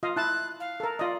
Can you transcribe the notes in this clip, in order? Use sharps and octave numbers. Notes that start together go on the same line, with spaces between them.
F4 D#5 F5
E4 A5 F#6
F5
A4 A#4
F4 D5 D#5